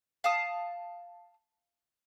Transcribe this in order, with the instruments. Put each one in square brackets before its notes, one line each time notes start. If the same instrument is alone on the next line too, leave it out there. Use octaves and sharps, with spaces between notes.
[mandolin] F5 A5 D#6